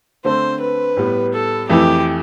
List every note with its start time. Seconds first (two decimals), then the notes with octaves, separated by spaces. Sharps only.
0.24 D3 A3 C4 C5
0.61 B4
0.97 A2 G3 B3
1.33 A4
1.69 F2 E3 A3 E4 G4